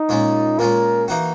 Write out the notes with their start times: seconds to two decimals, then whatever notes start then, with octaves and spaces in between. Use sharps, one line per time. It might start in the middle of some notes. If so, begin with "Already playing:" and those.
Already playing: D#4
0.09 A#2 G#3 C#4
0.59 A#2 G#3 C#4 A#4
1.08 E3 A#3 D#4 F#4